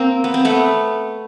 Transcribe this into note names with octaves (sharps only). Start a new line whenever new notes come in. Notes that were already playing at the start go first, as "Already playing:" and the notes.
Already playing: A#3 C4
B3
C4
A3 B3